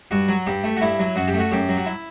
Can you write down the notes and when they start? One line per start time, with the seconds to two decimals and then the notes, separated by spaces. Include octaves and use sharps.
0.11 G2 F#4
0.29 F#3
0.47 G2 G4
0.64 A3
0.77 F#4
0.81 G2 E4
0.99 F#3
1.16 F#2 F#4
1.28 G4
1.34 A3 F#4
1.52 F#2 G4
1.69 F#3
1.78 F#4
1.86 E4